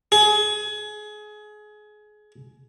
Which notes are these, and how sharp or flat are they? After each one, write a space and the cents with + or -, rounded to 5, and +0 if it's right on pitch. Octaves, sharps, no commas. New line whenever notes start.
G#4 +25